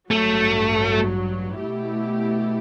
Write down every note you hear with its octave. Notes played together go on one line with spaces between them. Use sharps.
A1 G2 F#3 A3
B2 A3 E4 G4